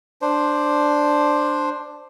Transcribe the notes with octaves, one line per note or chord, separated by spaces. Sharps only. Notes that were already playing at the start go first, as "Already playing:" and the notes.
D4 C5